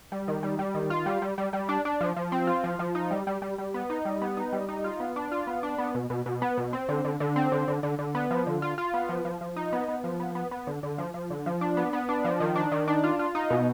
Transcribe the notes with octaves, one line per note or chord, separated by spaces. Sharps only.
G3
D#3
G3
G3
D#3
F4
G3
G3
G3
G3
D4
D4
F3
F3
C4
F4
F3
F3
D#4
G3
G3
G3
G3
B3
D#4
G3
B3
D#4
G3
D#4
F4
B3
D4
F4
B3
D4
B3
B2
B2
B2
B3
B2
C4
D3
D3
D3
C4
D3
D3
D3
D3
B3
F3
D3
F4
F4
B3
F3
F3
F3
D#4
B3
B3
F3
B3
B3
B3
D3
D3
F3
F3
D3
F3
D4
B3
B3
D4
F3
D#3
D4
D#3
D4
F4
F4
D#4
B2